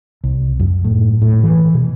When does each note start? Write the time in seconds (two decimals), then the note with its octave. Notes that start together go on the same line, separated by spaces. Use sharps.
0.24 C2
0.60 F#2
0.84 A2
1.22 A2
1.43 E3
1.74 B2